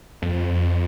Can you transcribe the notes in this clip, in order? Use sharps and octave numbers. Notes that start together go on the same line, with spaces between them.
F2